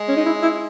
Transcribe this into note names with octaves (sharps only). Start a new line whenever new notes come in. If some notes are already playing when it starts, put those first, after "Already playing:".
Already playing: G#3
C#4
D#4
E4
E4